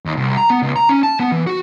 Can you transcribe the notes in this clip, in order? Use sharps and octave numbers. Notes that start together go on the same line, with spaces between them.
D#2
C2
A#5
B3
C#2
A#5
C#4
A5
B3
E3
F#4